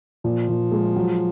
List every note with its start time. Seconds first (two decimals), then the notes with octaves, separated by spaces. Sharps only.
0.24 A#2 F3
0.49 A#2
0.72 G#3
0.96 F#3